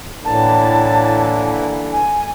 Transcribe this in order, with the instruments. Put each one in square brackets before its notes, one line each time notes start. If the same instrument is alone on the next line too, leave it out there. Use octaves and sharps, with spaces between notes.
[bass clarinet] A2 [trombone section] D3 E3 A#3 [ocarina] A5
[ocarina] G#5